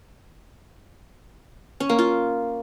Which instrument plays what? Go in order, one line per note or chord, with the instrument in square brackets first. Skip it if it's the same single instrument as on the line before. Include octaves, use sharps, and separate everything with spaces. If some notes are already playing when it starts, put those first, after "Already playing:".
[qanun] C#4
A#3
F4